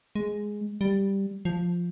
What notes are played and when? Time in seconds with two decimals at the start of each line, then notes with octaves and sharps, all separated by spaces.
0.15 G#3
0.81 G3
1.45 F3